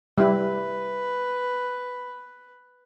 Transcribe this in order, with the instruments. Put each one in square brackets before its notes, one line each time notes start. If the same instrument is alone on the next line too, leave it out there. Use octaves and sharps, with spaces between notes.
[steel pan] G3 E4 [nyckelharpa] B4